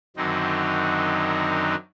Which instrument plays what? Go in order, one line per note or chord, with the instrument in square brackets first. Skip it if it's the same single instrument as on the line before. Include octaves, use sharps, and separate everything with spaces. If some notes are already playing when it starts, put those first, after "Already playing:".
[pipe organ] F#2 D3 D#3 F#3 C4 D#4